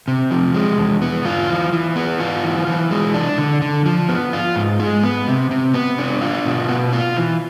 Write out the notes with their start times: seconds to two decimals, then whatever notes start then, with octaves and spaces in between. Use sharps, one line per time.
0.08 C3
0.31 F3
0.54 G#3
0.78 E2
1.02 B3
1.25 F4
1.50 E3
1.73 E3
1.96 B3
2.20 F4
2.44 E3
2.67 E3
2.91 G#3
3.14 D4
3.38 D3
3.62 D3
3.86 F3
4.09 B3
4.33 F4
4.56 G#2
4.80 G#3
5.03 B3
5.28 C3
5.51 C3
5.74 B3
5.98 D4
6.22 F4
6.45 B2
6.69 B3
6.93 F4
7.17 E3